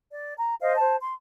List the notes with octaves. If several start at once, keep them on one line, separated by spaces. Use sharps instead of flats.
D5
A#5
C5 D#5 F5
C5 A5
C6